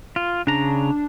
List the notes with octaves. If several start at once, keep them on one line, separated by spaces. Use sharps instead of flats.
F4
C#3 D4 A#5